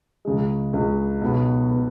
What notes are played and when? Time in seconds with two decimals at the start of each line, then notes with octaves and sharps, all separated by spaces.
0.25 C#2 C#3 G#3
0.73 C#2 C#3 G#3
1.21 B1 B2 B3
1.71 B2 B3